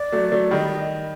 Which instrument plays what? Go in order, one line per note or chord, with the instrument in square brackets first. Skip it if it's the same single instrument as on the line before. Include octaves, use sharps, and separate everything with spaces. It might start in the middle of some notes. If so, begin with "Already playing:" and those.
Already playing: [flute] D5
[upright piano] F#3 A3
F#3 A3
[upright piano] D#3 G3 [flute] D#5